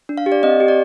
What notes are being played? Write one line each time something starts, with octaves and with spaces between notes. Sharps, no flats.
D4
F5
G4
D5
C4 D#5
G4
D5